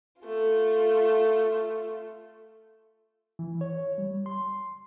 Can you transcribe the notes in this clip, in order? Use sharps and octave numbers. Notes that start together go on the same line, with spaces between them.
A3 F4
E3
C#5
G3
C6